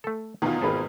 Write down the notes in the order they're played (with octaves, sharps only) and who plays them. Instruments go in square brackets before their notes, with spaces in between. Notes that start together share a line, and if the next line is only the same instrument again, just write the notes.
[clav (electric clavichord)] A3 A4
[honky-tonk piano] E2 B2 F4 [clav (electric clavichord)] D#3 [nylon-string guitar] B3 D#4
[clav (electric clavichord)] G#1 G#4 A4 [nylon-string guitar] C4 B4